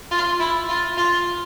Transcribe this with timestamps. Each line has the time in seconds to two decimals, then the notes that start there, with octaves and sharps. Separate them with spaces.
0.11 F4
0.40 E4
0.69 F4
0.98 F4